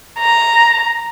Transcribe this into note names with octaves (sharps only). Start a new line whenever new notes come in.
A#5